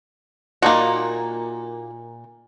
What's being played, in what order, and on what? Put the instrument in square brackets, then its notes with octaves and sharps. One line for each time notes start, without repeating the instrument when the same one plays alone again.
[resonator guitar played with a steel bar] A#2 [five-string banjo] A#3 D#4 F#4